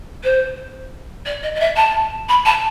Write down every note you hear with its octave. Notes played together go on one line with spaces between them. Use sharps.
C5
D5
D#5
D#5
E5
A5
B5
A5